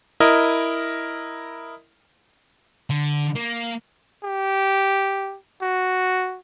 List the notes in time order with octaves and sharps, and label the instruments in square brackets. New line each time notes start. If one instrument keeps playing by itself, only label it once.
[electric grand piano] E4 A#4 D#5
[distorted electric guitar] D3
A#3
[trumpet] G4
F#4